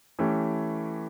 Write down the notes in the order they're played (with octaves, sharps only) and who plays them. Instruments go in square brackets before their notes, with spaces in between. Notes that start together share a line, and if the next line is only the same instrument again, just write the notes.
[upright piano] E3 A3 C#4 G4